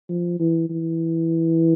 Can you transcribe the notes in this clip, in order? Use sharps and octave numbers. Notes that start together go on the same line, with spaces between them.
F3
E3
E3